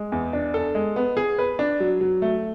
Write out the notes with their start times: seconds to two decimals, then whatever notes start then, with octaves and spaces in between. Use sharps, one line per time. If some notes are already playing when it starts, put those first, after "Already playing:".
Already playing: G#3
0.12 E2
0.33 D4
0.54 A4
0.75 G#3
0.96 B3
1.17 G#4
1.38 B4
1.59 D4
1.80 F#3
2.01 F#3
2.22 A3